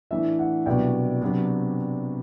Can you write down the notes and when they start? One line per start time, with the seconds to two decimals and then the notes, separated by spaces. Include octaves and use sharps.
0.11 A2 E3 A3 D4 E5
0.39 F#5
0.66 C2 B2 F#3 B3 D4 G5
1.21 C3 F#3 B3 D4